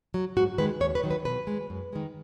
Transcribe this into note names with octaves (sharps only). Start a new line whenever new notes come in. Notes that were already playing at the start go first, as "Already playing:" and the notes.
F#3
G#2 F#4
D#3 G#3 B4
D#2 C#5
B4
D#3 F#3
B4
B2 B4
G#3
F#2
D#3 G#3